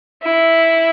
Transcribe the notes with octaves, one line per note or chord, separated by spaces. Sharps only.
E4